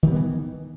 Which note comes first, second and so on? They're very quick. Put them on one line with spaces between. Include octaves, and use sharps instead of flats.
D#3 G3 B3 E3